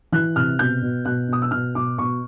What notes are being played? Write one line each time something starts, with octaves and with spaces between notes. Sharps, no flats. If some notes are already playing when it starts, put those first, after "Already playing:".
E3 F#6
C3 F6
B2 G6
B2
B2 F#6
B2 D#6
E6
B2 F6
B2 D6
B2 C#6